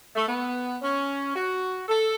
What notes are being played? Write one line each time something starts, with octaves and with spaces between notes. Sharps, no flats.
A3
B3
C#4
F#4
A4